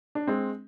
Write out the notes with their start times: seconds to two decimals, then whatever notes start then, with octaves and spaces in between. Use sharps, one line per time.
0.15 D4
0.27 G#3 C4